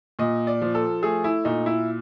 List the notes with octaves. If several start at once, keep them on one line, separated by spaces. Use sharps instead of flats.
A#2 D#5
D5
F3
A4
A3 G#4
E4
A#2 D#4
E4